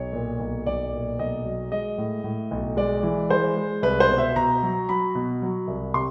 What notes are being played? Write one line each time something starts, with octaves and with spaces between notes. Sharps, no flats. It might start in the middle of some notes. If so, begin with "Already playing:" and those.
Already playing: B1 C#5
A#2
B1
B1 D5
A#2
B1 D#5
F#3
G#3 D#5
A2
A2
B1
G#3 D5
E3
G#3 C5
G#3
C2 B4
C5
B2
E5
B2 A#5
F#3
F#3 B5
B2
F#3
C2
C3 C6